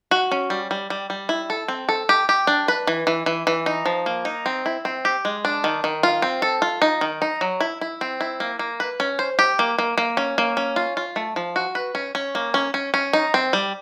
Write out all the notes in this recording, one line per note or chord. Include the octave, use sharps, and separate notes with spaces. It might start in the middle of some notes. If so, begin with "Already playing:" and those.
F#4
C#4
G3
G3
G3
G3
E4
A4
C4
A4
G4
G4
D4
B4
E3
E3
E3
E3
D#4
F3
A#3
D#4
C4
E4
C4
G4
G#3
D4
D#3
D#3
F4
C4
A4
F4
D#4
D#3
D#4
F#3
E4
E4
C4
E4
A#3
A#3
B4
C#4
C5
G4
A#3
A#3
A#3
C#4
A#3
C#4
F4
F4
A3
F3
F#4
B4
C#4
C#4
A#3
C#4
C#4
C#4
D#4
C4
G3